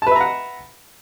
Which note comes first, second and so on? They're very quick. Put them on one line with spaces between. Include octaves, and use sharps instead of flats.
A5 B4 E5 A#5 F#5